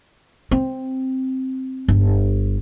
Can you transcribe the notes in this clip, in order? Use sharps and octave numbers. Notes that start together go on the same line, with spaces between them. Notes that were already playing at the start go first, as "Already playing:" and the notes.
C4
G1